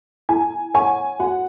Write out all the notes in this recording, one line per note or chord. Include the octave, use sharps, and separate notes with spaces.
E4 G#5
A#4 C#5 F#5 G#5 C#6
F#4 F#5